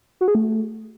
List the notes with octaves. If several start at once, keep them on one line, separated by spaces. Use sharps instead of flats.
F#4
G#4
A3